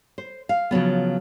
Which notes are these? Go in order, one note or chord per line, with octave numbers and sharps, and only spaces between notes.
C5
F5
C#3 F3 F#3 B3